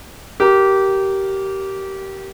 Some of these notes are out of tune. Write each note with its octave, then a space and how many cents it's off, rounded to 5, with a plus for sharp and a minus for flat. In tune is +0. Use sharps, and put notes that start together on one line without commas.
G4 -20 A#4 +0